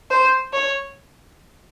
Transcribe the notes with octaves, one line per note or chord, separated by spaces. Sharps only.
C5
C#5